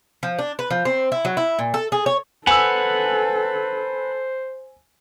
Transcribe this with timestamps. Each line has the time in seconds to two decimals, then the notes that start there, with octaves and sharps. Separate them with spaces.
0.23 F3
0.39 D4
0.59 B4
0.70 F3
0.85 C4
1.12 E4
1.25 F#3
1.37 E4
1.59 A#2
1.74 A4
1.92 G#4
2.06 C#5
2.47 A4 B4 C5 F#5 G#5 E6